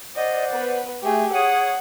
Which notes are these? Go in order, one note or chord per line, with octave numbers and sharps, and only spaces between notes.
C5 D5 D#5 F#5
B3 B4
A3 G4 G#4
G#4 C#5 F#5 D#6